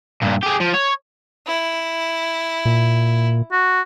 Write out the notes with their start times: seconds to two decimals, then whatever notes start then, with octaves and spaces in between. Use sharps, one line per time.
0.22 G2 A#2
0.43 G4 G#4
0.60 F3
0.74 C#5
1.47 E4
2.65 A#2
3.52 F#4